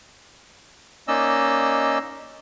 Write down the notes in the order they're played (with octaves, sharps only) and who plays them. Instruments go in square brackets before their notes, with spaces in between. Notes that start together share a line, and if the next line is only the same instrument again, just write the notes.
[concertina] A#3 C#4 D#4 D5 D#5 E6